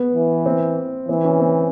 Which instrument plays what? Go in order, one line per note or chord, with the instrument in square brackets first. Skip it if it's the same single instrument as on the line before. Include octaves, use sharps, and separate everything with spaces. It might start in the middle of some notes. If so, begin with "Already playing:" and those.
Already playing: [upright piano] B3
[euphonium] E3
[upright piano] C4
[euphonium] E3 [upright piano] C4
[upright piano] C#4
C4